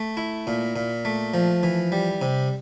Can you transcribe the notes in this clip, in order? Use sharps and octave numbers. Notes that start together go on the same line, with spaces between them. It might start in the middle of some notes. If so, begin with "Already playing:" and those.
Already playing: A3
E4
A#2
A#2
A3
F3
E3
G3
C3